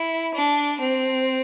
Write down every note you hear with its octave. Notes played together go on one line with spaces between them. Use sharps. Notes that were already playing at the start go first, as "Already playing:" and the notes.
Already playing: E4
D4
C4